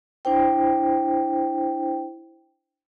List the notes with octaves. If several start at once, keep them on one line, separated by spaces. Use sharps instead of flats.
D4 E4 C5 G5